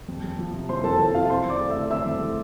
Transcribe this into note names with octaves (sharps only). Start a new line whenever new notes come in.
F2
F2
F3
C3
F2 C5 C6
F2 A4 A5
F3 A4 A5
C3 F4 F5
C4 C5 C6
F2 D5 D6
A3
E5 E6
D3
C4 E5 E6
F2
A3